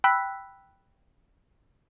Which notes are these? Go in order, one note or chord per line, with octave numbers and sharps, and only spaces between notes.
G5 B5 E6 F#6 B6